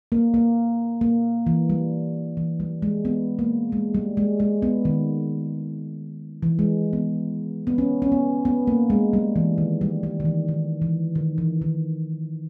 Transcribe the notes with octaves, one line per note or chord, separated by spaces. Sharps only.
A#3
A#3
A#3
E3
G3
E3
G3
G#3
B3
A#3
G#3
G3
G#3
G#3
B3
D#3
E3
G#3
B3
B3
C#4
C#4
B3
B3
A#3
G#3
G3
E3
D#3
G3
G3
D#3
E3
D#3
E3
D#3
E3
D#3